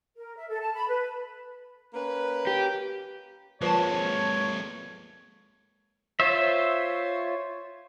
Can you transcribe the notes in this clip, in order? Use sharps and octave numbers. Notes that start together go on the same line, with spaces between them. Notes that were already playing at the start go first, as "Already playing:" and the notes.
A#4
E5
A4
A5
B5
B4
A#3 C#4 B4
G4
F3 G#3 A#3 B4 C#5 A5
F4 C5 C#5 E5